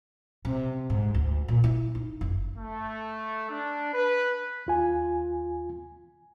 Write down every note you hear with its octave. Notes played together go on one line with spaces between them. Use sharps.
C3
G#2
D2
A#2
E4
D#4
F#1
A3
D4
B4
D#2 F4 G#5